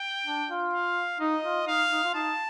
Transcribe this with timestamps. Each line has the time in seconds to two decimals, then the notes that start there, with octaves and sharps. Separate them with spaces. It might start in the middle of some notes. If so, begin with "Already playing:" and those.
Already playing: G5
0.26 D4
0.50 F4
0.73 F5
1.20 D#4 D#5
1.44 F4
1.67 D#4 F5
1.91 D#4
2.04 F4
2.15 D#4 A5